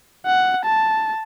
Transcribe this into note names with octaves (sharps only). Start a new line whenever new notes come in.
F#5
A5